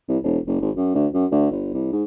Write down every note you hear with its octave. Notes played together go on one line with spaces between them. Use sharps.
C2
E1
F#1
G#1
F#2
D2
F#2
D2
G1
C2
G#2